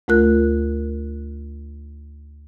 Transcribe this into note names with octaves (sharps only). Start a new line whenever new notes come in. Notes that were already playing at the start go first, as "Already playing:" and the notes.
D2 A3 F4 A#4 F#6